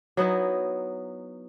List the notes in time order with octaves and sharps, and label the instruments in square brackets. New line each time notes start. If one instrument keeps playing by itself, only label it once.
[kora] F#3 B3 D#4 E4